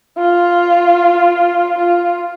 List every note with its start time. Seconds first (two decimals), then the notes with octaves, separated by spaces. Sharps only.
0.17 F4
1.77 F4